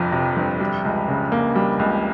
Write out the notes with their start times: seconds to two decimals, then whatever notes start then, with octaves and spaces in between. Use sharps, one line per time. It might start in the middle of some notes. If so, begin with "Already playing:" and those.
Already playing: G1 F2 C3 F3
0.12 C3
0.37 G1
0.60 G3
0.85 C#2
1.08 C#3
1.32 A#3
1.55 G3
1.79 C#2